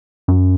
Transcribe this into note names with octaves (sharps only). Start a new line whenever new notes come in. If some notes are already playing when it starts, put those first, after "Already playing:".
F#2